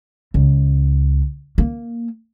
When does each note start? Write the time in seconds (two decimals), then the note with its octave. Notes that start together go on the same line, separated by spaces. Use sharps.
0.34 C#2
1.58 A#3